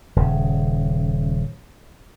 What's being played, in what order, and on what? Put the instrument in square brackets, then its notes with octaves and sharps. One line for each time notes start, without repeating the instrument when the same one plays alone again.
[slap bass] D#1 C#3